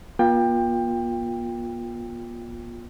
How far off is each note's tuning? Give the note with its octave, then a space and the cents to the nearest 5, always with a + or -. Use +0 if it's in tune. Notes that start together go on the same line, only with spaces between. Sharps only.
A#3 +45 F4 +15 G5 +20